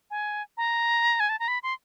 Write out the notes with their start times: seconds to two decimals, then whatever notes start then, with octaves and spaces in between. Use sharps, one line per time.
0.11 G#5
0.57 A#5
1.20 G#5
1.29 A5
1.39 A#5
1.48 B5
1.63 C6